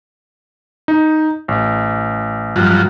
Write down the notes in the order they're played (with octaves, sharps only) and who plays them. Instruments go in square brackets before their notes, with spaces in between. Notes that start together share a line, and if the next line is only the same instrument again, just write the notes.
[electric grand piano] D#4
A1
[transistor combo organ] G2 F3 F#3